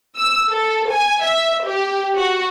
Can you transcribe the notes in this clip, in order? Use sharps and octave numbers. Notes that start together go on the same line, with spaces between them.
E6
A4
G#5
E5
G4
F#4